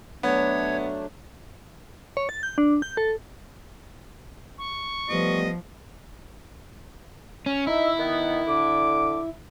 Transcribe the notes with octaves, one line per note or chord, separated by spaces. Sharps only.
F#3 A3 B3 D4 C#5
C#5
A6
G6
D4
G6
A4
C#6
F3 G3 A3 B3 D#5
C#4
D#4 E4 E5
D#3 B3
D3 D6